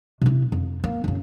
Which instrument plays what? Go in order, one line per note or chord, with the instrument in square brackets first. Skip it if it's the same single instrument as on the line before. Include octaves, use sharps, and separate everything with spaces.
[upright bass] C3 E4
F2
A#3
F#1 C#3